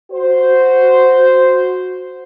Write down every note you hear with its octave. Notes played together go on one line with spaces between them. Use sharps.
F#4 C5